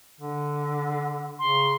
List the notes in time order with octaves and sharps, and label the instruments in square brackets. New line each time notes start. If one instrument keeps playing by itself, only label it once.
[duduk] D3
[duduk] C#3 [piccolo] C6